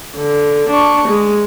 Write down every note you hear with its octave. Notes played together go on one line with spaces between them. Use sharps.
D3
D4 C#6
G#3